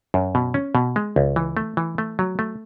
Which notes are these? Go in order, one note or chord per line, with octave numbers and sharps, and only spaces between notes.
F#2
B2
C#4
B2
G#3
C#2
E3
A3
E3
A3
F#3
A3